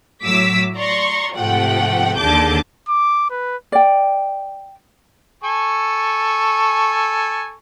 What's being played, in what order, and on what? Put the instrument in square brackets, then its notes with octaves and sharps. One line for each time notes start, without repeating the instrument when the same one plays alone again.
[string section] A2 F#3 D6 E6 B6
D5 A#5 C6 C#6
G#2 C3 F3 A3 F#5 G5
D#2 D3 G#4 A5 D6 G6
[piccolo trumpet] D6
B4
[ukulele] D5 G5
[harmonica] A4 G#5 C#6